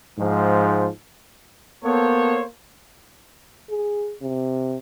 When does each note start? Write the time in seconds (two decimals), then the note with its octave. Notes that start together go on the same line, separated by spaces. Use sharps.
0.19 G#2 F3
1.84 A#3 B3 A4 C5 C#5
3.70 G#4
4.22 C3